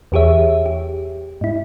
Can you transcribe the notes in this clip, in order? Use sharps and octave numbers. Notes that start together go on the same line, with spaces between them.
E2 E3 G4 G#4 C#5 E5
G4
G#2 E4